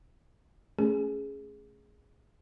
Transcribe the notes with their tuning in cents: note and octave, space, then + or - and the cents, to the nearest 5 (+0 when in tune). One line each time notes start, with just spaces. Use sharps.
A3 +0 C#4 +0 G#4 +0